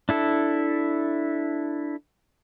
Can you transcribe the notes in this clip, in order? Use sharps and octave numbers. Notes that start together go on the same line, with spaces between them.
D4 E4 A4